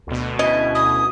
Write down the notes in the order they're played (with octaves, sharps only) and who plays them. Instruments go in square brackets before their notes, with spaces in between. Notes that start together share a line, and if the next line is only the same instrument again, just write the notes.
[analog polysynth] D2 B2
[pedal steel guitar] C#4 E4 [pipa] D#5
[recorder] D#6